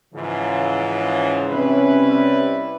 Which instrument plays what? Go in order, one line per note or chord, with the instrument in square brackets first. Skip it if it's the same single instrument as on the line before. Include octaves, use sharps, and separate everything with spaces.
[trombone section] G#2 E3 F3 [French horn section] C#3
[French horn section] C3 C#4 [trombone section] G3 E4 B4